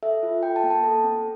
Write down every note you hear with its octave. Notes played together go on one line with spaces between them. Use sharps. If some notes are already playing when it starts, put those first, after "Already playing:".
A4 E5
F4
A4 G5
A5
A#3
A5
A4
C4